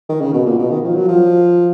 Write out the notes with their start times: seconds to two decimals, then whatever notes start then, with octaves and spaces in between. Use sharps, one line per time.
0.09 D#3
0.21 C#3
0.33 B2
0.46 A#2
0.59 B2
0.70 D#3
0.84 F3
0.95 F#3
1.08 F3